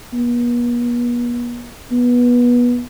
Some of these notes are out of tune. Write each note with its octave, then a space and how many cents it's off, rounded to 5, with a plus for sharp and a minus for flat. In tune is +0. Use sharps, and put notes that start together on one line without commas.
B3 -45
B3 -20